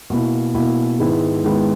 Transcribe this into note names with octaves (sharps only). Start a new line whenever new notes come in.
B2 A#3 E4
B2 A#3 E4
G#2 D#3 G#3 B3 E4
G#2 D#3 G#3 B3 E4